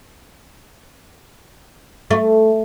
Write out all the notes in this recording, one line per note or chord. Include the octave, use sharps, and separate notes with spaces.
A3